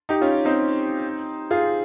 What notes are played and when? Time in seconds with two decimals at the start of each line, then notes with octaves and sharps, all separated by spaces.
0.09 D#4 G4
0.21 C#4 F4
0.45 C4 D#4
1.51 F4 G#4